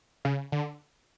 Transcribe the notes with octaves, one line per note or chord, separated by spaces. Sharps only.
C#3
D3